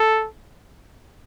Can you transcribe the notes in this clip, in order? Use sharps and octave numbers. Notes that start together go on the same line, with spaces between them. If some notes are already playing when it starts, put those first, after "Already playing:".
Already playing: A4